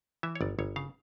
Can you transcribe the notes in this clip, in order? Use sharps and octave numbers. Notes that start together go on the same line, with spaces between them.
E3 E5
C#5
G1 D5
G1 C#5
C#3 F5